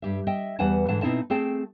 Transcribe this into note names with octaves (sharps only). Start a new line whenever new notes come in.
G2 G4 E5
D#5 E5 G5
E2 G3 B4 F#5 G#5 A5
G#2 D3 E3 F#5 A5
B2 C4 D#4 E4 E5 A5
A3 C4 G#4 G5 A5